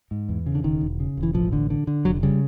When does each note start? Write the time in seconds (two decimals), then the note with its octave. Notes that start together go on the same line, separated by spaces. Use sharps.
0.11 G#2
0.29 E2
0.46 C#3
0.55 D3
0.63 E1 D#3
0.81 E1
1.00 C#3
1.17 E1
1.23 E3
1.34 A1 F3
1.53 D3
1.70 D3
1.87 D3
2.05 F1 F#3
2.23 C#3 G3